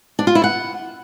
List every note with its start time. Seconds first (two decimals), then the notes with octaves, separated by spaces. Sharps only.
0.19 D4
0.27 F4
0.35 E4
0.44 F#5